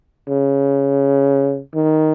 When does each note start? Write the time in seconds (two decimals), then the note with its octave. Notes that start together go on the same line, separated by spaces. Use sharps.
0.28 C#3
1.75 D#3